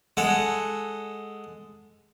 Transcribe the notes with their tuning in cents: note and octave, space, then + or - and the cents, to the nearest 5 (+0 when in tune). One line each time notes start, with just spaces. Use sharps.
G#3 +0 A4 +0 F#5 +0